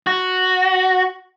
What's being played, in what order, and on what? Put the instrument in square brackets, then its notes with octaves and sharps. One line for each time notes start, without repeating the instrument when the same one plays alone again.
[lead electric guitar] F#4